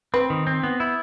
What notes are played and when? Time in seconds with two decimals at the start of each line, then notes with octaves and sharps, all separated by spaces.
0.14 C4 B4
0.30 D#3
0.47 C4
0.63 B3
0.80 E4